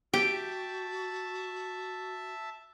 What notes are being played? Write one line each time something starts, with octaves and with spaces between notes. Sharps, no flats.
F#4 G4 E5 G5 A5